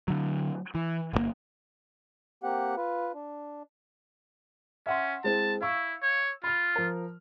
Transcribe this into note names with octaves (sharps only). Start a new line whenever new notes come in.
D3 F#3
E3
G1 B2 A#3
A#3 C4 G4 F#5
F4 B4
D4
C#4 E5 F#5 C6
G#3 C4 E4 A5
E4 F5 C#6 E6
C#5
F4 B5 F6
F3 A#4